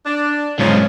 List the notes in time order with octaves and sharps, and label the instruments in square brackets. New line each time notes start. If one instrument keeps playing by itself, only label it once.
[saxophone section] D4
[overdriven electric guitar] B1 G#2 [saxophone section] C#3 F3 [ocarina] C#5